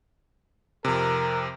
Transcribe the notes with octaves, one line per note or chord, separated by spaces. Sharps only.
F2 C3 A#4